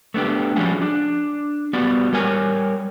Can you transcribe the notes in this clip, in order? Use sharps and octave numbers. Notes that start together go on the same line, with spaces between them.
A3 B3 D4 G4
F3 G3 C#4 D4 F#4 G#4
D4
G3 B3 F#4 D5
G3 A#4 C#5 G#5